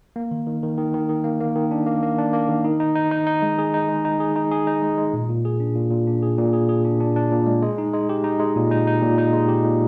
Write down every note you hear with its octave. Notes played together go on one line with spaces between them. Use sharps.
A#3
D#3
D#3
D#3
D#3
D#3
D#3
A#3
A#3
D#3
D4
A#3
A#3
D4
A#3
D#3
D#4
D#4
D#4
D#4
D#4
G#3
G#4
D#4
G#3
D#4
G#4
D#4
G#4
D#4
G#3
G#3
A#2
A#2
G#4
D4
A#2
A#2
D4
G#4
A#2
G#4
G#4
D4
D4
D4
A#2
G#3
G#3
D#4
G#3
G4
D#4
G#3
A#2
D#4
D#4
A#2
D#4
G#3
G4
A#2